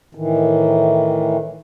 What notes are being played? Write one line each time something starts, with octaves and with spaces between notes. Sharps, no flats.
A2 D#3 E3